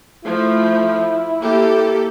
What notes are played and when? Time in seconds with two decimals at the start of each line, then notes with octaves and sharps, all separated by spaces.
0.24 F3 A3 E4
1.41 A#3 G4 A4